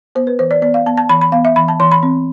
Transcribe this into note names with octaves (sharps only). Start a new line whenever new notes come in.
B3 C5
B4
E3 C5
D5
B3 D5
F5
B3 A5
A5
E3 B5
B5
B3 F5
E5
E3 B5
A5
E3 C6
B5
C4